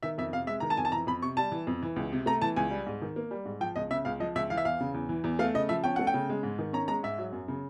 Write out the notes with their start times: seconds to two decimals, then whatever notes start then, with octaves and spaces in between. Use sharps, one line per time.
0.03 D#3 E5
0.18 F2 E5
0.33 C3 F5
0.47 G#3 E5
0.60 D#3 A#5
0.70 A5
0.77 F2 G#5
0.85 A5
0.92 E3 A#5
1.07 F2 B5
1.22 C3 C#6
1.37 G3 A5
1.52 E3
1.67 F2
1.83 E3
1.96 C#2
2.12 C3
2.26 A3 A#5
2.42 E3 A5
2.56 C#2 G#5
2.71 G3
2.87 G#2
3.02 D#3
3.16 A#3
3.31 G3
3.45 G#2
3.61 F3 G5
3.76 C#2 D#5
3.91 C#3 E5
4.05 C#2 F5
4.20 F3 D#5
4.35 C#2 E5
4.50 E3 F5
4.57 E5
4.65 E2 F5
4.80 C#3
4.94 E2
5.09 E3
5.24 E2
5.39 A3 F5
5.54 C#3 D#5
5.69 F3 E5
5.84 C#4 G5
5.96 A3 F#5
6.07 G5
6.14 C#3
6.29 G#3
6.43 G#2
6.59 D#3
6.73 C#4 A#5
6.88 G#3 A#5
7.03 G#2 E5
7.18 F#3
7.33 F#2
7.48 C#3